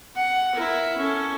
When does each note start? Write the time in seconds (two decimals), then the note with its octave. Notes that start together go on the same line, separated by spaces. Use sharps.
0.16 F#5
0.55 E4 A#4
0.98 C#4 A4